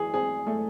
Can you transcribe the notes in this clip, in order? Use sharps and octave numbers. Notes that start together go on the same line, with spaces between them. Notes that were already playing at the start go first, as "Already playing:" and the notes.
Already playing: E3 G#4
C4 G#4
A3